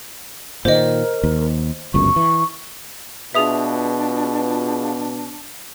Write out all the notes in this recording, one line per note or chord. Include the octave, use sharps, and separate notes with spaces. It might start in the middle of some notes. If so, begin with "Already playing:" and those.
A#2 D3 D#3 A#4 C5 D#5
D#2
G1 C#2 F#2 C#6
E3
B2 D4 F4 G#4 B4 E5 D#6 F7